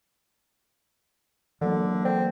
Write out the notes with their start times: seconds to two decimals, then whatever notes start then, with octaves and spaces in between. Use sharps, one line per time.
1.61 D3 E3 F#3 A#3
2.05 C4